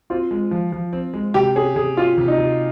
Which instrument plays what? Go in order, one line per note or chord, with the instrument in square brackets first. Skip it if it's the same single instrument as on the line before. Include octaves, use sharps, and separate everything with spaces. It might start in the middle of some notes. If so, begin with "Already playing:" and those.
[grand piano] C4 [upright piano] F4
[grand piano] G#3
F3
F3
C4
G#3
[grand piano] C3 [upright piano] G4
[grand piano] C#4 [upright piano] G#4
[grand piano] C3 [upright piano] G#4
[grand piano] C#4 [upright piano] F4
[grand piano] C3
[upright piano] D#4
[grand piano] C3